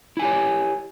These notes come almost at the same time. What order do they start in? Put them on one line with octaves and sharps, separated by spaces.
E4 G#5 G4 C#5